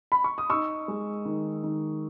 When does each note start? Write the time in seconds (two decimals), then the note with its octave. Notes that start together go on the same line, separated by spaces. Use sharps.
0.12 B5
0.24 C#6
0.38 D#6
0.50 D#4 C#6 E6
0.88 G#3
1.25 D#3
1.63 D#3